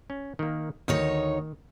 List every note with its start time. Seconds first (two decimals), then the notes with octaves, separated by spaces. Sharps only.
0.10 C#4
0.39 D#3 A#3
0.88 D2 D#3 D#4 C#5